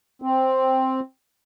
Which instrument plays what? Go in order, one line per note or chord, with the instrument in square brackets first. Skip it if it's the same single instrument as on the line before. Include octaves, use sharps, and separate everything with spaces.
[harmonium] C4